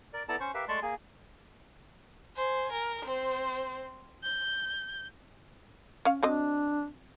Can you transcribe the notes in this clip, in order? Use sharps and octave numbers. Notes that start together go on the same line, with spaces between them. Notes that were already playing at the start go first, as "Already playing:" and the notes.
A#4 D5
B3 E4 A4 D5 A5 A#5
C#4 C5 C#6
G4 A#4 B4 E5 F5
G#3 A3 D5 A5 C6 C#6
A#3 G#4 G#5
C5 G#5
A#4
C4 C5
G6
C#4 F5
F#3 C4 D4 D#5